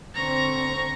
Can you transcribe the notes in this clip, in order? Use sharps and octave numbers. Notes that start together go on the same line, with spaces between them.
D3 C4 A#5 C#6